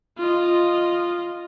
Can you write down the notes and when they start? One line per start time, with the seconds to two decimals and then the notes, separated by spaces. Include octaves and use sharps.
0.17 F4 D#5